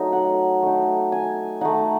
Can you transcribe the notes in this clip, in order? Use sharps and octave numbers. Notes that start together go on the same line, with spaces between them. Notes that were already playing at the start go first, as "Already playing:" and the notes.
Already playing: F#3 A3 D#4
F#5
A3 D#4
G#5
A3 D#4 F#5